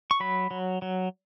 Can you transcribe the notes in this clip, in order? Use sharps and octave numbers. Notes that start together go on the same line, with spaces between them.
C#6
F#3 B5
F#3
F#3